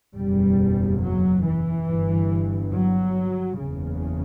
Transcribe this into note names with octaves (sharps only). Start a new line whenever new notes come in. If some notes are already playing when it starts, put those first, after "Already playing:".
F#1 E2 B2 G3
F#3
E3
G1 G2
F#3
F#1 E2 C#3